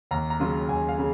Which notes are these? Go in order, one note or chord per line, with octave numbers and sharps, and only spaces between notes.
D#2 A#5
A#5
C#3 F#3 C#4 F4
D#2 G#5
F5
C#3